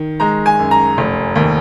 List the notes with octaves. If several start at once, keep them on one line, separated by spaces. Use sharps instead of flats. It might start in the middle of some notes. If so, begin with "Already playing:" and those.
Already playing: D#3
G#3 A#5
G#5
F#2
A#5
F1
D#2